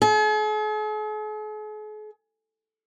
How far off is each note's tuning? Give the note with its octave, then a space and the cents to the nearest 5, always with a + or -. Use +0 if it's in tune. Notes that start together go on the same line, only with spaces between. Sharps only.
G#4 +45